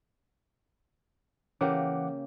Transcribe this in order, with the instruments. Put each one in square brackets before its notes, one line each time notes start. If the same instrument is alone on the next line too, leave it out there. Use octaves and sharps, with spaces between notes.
[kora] C#3 A#3 G4 [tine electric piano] E3 F#5 D6